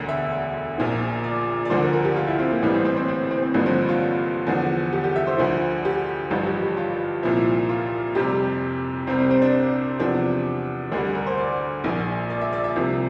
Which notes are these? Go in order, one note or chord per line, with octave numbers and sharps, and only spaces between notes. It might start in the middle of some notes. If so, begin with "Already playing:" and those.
Already playing: E1 D2 D3
E5
A#1 A#2 F3
D5
D5
D2 D3 F3 C5
A#4
A#4
G4
F4
E4
C4
A#3
A1 A2 E3 G3
C4
C4
C4
C4
C4
C4
A1 G2 D3 F3 A#3
C4
F4
E2 D3 F3
G4
G4
E5
C5
D2 D3 F3
G4
A1 G2 F3 F4
G4
G4
F4
C2 A#2 F3 E4
F4
F1 F2 C3 G3 G4
C2 C3 G3 C4
C4
C4
D4
E2 C3 F3 D4
D2 D3 G3 D4
A#4
C5
D5
A#1 A#2 F3
D5
E5
D5
E5
C2 C3 F3